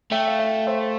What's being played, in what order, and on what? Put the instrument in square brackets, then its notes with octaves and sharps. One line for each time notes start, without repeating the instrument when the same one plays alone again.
[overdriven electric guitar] A3 [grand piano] E5 G5
[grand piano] F5
E5 G5
C5 E5